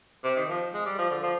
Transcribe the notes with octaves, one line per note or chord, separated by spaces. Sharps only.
C3
D#3
F3
G#3
G3
F3
D3
F3